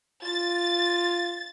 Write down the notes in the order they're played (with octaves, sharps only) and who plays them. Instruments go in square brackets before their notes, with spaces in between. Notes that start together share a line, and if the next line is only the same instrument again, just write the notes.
[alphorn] F4 [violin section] A6